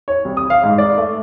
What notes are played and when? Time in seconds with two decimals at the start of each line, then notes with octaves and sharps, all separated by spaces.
0.08 C#5
0.25 C2
0.37 D#6
0.50 F5
0.64 G#2
0.78 D5
0.98 A3